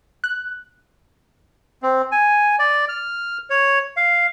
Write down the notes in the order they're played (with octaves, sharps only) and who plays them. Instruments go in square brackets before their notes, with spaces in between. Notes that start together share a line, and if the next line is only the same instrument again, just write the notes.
[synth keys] F#6
[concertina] C4
G#5
D5
F6
C#5
F5